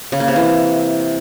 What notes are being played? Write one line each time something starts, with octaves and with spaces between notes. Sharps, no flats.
C#3
A#3
C3
E3